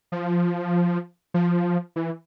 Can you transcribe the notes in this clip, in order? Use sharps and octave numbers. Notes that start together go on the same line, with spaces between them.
F3
F3
E3